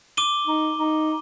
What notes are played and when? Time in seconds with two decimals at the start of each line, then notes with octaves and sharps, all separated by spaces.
0.17 D6 D#7 G7
0.47 D#4
0.78 D#4